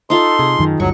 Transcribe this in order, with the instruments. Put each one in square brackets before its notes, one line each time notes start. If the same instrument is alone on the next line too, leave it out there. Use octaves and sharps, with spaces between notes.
[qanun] D#4 F4 A4 [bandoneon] C6
[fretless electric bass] C3 [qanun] G#4
[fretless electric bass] F#2 D#3
[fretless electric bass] G1 D2 G2 [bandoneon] F#3 [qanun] C#6